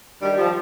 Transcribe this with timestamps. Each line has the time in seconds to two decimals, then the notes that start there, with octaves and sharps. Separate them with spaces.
0.21 G2 D#3 G3
0.38 F3